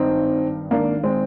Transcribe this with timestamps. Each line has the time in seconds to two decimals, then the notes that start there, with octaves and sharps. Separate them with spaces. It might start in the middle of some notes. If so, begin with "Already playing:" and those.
Already playing: G#1 G2 D#3 C4 D#4
0.71 G#1 G#2 D#3 A#3 D4
1.03 G#3 C4